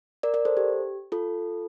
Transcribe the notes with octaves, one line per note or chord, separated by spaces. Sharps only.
A#4 D5
A#4 D5
A4 C5
G4
F4 A4